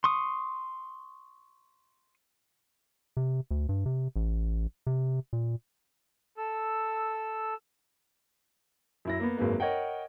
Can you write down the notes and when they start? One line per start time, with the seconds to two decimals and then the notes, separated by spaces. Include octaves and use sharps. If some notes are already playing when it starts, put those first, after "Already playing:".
0.04 C6 C#6 D#6
3.17 C3
3.51 D2
3.69 G2
3.86 C3
4.16 A1
4.87 C3
5.33 A#2
6.38 A4 E6
9.05 F#2 E4 A#6
9.20 A#3 B3
9.37 G#1 F#2 G#3 A#3 B4
9.60 A#4 C#5 D#5 F#5 G5